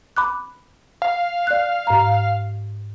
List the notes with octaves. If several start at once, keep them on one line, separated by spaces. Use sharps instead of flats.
B5 D6 F#6
F5
D5 F#6
G#2 A#5